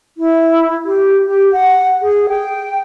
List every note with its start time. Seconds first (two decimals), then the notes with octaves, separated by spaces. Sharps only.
0.18 E4
0.85 G4
1.28 G4
1.52 F#5
2.02 G#4
2.29 G5